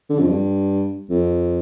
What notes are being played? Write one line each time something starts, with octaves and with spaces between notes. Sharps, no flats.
D3
F2
G2
F2